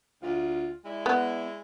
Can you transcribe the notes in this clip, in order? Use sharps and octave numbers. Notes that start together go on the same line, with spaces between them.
D2 F4
G#3 E4 D5
B3